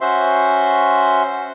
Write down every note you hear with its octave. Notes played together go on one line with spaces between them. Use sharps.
C#4 F#4 C5 E5 C6